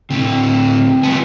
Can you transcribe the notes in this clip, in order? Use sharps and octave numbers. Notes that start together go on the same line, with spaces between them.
D2 A2 C4
G3 B3 F4 D#5 G#5